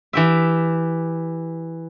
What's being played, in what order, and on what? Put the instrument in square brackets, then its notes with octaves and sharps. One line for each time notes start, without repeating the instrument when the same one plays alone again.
[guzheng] E3 G4 E5